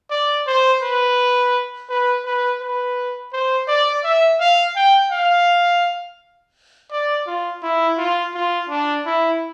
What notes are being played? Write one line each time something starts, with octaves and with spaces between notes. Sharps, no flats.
D5
C5
B4
B4
B4
B4
C5
D5
E5
F5
G5
F5
D5
F4
E4
F4
F4
D4
E4